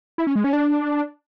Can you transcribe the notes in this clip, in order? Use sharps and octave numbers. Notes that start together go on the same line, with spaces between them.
E4
C#4
G#3
C#4
D4